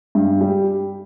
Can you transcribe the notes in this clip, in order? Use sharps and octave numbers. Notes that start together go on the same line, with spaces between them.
G2
G3